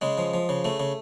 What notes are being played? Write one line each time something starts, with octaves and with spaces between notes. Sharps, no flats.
C#3 G#3
F3
F3
C#3
C#3 A3
C#3